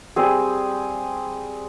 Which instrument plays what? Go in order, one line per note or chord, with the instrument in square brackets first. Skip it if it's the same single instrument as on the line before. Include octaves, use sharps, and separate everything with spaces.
[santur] G3 C4 G#4